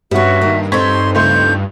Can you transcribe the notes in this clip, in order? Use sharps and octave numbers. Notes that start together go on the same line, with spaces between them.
G2 G3 B3 C#4 F#4 E5 F#5
D#3 A#3
C4 D#4 A4 C5 C6 C#6 G#6 B6
C#2 A3 C6 G6